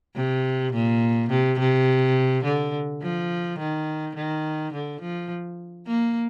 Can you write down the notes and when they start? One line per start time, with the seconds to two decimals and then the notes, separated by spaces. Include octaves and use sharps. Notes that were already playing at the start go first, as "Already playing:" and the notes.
0.16 C3
0.73 A#2
1.30 C3
1.59 C3
2.44 D3
3.02 F3
3.59 D#3
4.16 D#3
4.73 D3
5.01 F3
5.87 A#3